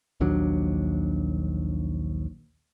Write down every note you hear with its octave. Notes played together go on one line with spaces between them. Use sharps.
A#1 D#2 F#3 D4